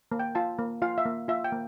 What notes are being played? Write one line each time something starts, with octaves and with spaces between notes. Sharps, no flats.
A#3
G5
F4 A5
A#3
F4 F5
E5
A#3
F4 E5
G5
A#3